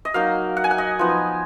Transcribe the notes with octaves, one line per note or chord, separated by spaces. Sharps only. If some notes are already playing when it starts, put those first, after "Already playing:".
D#5
F#3 A#3 D#4 F5
F#5
G#5
F#5
D#5
F3 B3 D#4